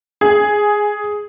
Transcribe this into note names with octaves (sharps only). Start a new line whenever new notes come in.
G#4